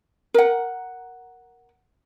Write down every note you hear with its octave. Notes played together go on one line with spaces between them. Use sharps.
A#4 F#5